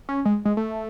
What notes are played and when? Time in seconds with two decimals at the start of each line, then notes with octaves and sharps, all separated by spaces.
0.09 C#4
0.25 G#3
0.45 G#3
0.57 A3